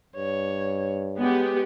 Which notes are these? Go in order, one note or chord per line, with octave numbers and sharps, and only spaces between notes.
G2 C#5
G#3 B3 G4